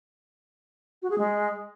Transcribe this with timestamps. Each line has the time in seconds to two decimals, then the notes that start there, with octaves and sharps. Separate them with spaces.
1.02 F#4
1.10 G#4
1.18 G#3